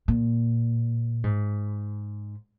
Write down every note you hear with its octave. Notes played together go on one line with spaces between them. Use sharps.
A#2
G#2